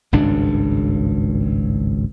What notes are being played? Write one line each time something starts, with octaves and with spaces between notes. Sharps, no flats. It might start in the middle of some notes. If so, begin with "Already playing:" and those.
G#1 C#2 G2 D4